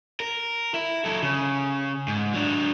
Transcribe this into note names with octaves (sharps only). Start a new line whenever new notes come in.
A#4
E4
F#3 A4
C#3
G#2
F#3 D4